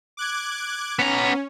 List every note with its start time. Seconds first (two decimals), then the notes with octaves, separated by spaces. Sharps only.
0.17 D6 F#6 G#6
0.99 B3 C#4 A#5